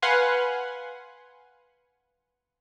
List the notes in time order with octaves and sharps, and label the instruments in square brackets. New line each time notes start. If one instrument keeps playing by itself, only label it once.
[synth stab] B4 F5 F#5 G#5 C6